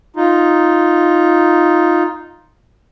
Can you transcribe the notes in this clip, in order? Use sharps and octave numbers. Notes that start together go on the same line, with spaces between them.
D#4 F4